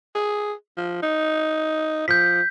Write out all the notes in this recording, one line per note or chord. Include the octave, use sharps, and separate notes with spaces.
G#4
F3
D#4
F3 G6 B6